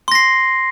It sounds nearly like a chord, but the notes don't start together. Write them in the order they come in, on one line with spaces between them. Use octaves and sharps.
C6 A#6 C7